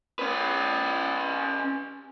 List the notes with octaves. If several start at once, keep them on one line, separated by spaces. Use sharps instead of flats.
C#4 B4